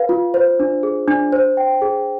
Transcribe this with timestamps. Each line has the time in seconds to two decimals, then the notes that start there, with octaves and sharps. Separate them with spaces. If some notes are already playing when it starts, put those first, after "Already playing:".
Already playing: B4 F5
0.09 F4
0.34 C5
0.60 D4
0.83 G#4
1.08 D4
1.32 C5
1.57 G5
1.82 G#4